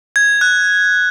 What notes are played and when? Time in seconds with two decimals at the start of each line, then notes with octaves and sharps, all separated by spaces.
0.16 G#6
0.41 F#6